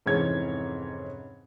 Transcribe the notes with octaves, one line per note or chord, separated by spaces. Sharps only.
F1 G#2 E3 C#4 C#5 G#6